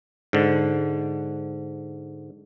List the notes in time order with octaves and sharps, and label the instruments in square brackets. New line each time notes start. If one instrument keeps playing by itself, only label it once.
[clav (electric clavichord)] G#2 D3